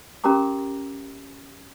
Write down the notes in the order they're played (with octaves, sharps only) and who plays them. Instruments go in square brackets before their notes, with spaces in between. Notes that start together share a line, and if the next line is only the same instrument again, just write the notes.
[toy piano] C#4 G4 A#4 A#5 D6